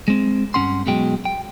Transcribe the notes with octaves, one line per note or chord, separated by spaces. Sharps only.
G#3 C4
G2 D#3 C#4 F#5 C6
B1 B2 F#3 G#3 G5
G5